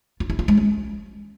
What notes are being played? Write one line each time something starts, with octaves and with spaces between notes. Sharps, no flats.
F4
E4
F4
G#3
C#4